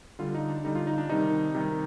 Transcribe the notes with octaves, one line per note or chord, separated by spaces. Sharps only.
D3 G3 F4
D#4
D4
D3 G3 D#4
F4
D#4
D4
C3 D#3 G3 D#4
C3 D#3 G3